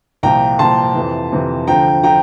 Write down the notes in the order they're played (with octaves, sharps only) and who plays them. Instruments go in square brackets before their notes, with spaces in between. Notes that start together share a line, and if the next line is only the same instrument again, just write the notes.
[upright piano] C2 A#2 F3 G5 A#5
C2 A#2 F3 A5 C6
F2 C3 E3
F2 C3 E3
D2 D3 F3 G5 A#5
D3 F3 G5 A#5